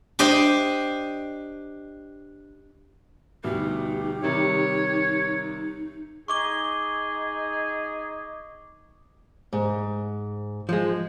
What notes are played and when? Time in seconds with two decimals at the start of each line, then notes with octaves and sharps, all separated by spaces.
0.19 D4 G4 C5 D#5
3.44 D2 B2 G3 D#4 G4
4.23 C3 D#3 G3 C#5
6.28 D#4 G#4 C#6 D6 G7
9.53 G#2
10.69 F3 G#3